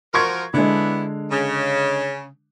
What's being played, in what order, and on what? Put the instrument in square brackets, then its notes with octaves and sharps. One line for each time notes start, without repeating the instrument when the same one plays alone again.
[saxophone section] F3 F#4 A#4 [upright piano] C6 C#6 G#6
[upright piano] D3 G#3 [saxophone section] B3 D4 E4
[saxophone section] C#3